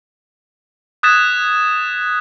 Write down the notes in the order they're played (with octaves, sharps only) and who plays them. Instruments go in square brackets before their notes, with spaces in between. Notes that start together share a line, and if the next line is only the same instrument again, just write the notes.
[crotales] D#6 F#6 G#6 A6 B6 E7